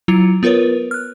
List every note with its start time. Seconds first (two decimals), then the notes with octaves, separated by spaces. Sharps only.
0.08 F#3 E4 F4 C#7 F7
0.43 B3 F4 A#4 B4 C#5
0.91 F6 F#6